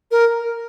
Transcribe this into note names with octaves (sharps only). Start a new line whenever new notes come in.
A#4